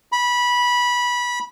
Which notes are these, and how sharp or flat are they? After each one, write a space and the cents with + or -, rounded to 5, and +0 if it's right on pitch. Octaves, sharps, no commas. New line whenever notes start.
B5 -20